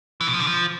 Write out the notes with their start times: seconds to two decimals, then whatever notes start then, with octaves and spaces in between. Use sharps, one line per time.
0.21 E3
0.27 B2
0.34 F3
0.40 D3
0.47 F3